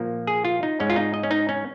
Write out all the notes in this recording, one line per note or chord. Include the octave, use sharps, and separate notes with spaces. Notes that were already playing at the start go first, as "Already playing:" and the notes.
Already playing: A#2 F3 A#3
G#4
F4
D#4
G#2 G#3 C#4
F4
D#4
D#5
C#4
D#4
C#4